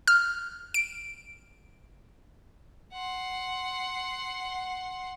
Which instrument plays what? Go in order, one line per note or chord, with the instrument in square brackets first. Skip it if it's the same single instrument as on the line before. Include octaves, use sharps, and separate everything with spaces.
[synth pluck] F6
D7
[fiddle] F#5 C6